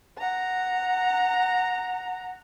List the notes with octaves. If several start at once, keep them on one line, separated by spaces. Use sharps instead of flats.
F#5 A#5